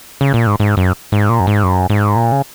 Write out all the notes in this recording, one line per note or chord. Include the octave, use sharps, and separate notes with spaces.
C#3
A#2
G#2
G#2
F#2
G#2
A#2
F#2
G#2
F#2
G#2
A#2
C#3